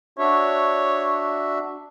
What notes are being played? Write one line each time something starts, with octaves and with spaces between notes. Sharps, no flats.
D4 F#4 C#5 E5